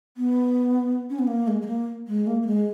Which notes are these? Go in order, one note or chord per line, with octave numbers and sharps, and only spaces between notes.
B3
C#4
B3
A#3
G#3
G#3
A#3
G#3
A#3
A#3
G#3